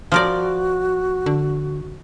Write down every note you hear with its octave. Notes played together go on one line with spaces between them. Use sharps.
F3 F#4 A#4 D5
D3